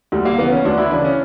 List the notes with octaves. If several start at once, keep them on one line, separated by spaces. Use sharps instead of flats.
D2 G3
A#3
C#3 E3 B3
C#4
D2 D4
E4
C#3 E3 D4
C#4